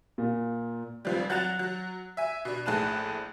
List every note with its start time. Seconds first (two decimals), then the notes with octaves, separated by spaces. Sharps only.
0.18 A#2
1.05 F1 F3 G3
1.30 F#3 F#5 F#6 A6 E7 F7
1.59 F#3
2.17 E5 G#5
2.45 B2 D4
2.66 A#1 A2 G#4 A5 F#6 E7